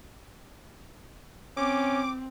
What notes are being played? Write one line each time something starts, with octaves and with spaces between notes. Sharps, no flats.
C4 C#4 D6